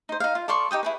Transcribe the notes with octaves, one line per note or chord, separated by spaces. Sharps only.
D#4 C5
D#4 F5
F4
A4 D5 C6 C#6
D#4 G4 G5 D#6
E4 G#4 B4